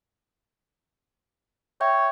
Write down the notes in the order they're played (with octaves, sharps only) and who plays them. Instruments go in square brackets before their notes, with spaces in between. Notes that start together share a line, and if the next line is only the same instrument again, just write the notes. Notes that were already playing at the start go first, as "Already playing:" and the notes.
[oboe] C#5 [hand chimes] E5 G5 G6